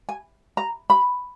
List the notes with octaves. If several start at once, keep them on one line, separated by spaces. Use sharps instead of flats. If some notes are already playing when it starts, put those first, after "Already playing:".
G#5
A#5
B5